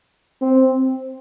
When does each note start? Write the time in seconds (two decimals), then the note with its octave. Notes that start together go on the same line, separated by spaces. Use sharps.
0.42 C4